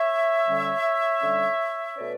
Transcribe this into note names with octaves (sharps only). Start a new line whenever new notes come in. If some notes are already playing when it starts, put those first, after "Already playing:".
Already playing: C#5 E5
D3 G3 C#4
D3 G3 C#4
B2 A3 C#4 B4 D5